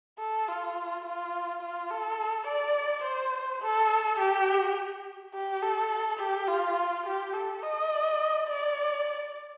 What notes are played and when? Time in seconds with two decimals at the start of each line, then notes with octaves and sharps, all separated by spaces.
0.19 A4
0.48 F4
1.05 F4
1.62 F4
1.91 A4
2.47 D5
3.04 C5
3.62 A4
4.20 G4
5.34 G4
5.62 A4
6.20 G4
6.48 F4
7.06 G4
7.34 A4
7.63 D#5
8.48 D5